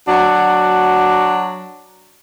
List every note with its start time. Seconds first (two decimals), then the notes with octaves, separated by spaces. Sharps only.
0.08 F#3 D4 F#4